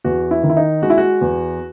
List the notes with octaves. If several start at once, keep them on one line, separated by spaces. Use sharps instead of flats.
E2 F#4
E4
D#3
E4
D#4
G#3 F#4
E4
F#4
E2